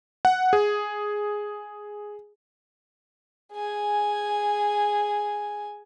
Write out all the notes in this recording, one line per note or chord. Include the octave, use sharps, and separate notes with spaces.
F#5
G#4
G#4 G#5